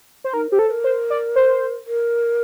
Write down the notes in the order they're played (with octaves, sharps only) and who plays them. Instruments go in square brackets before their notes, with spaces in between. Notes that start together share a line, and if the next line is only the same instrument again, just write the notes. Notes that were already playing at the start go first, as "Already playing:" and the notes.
[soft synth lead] C5
[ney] D#4 [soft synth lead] A#4
[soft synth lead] G4 [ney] C5
[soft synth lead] A4
[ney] C5
A#4
[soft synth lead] C5
D5
C5
[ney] A#4